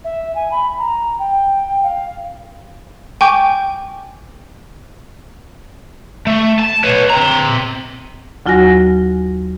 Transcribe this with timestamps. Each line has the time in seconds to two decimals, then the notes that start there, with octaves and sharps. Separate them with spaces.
0.04 E5
0.35 G#5
0.51 B5
0.78 A#5
1.19 G5
1.83 F5
3.21 G5 G#5 C#6 D6 G6
6.27 A3
6.60 A5
6.84 B4 C#5
7.10 C4 A#5
8.46 D#2 F#3 F4 F#4 G#5 A#6